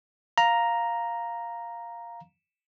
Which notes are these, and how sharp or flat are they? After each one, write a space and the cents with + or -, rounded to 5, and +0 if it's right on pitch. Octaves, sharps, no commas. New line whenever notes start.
F5 +0 A#5 +0